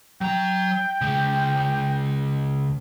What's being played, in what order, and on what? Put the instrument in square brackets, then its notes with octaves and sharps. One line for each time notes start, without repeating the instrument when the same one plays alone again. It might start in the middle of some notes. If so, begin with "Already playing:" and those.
[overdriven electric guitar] F#3 A#5 [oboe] G5
[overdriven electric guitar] C#3 G#3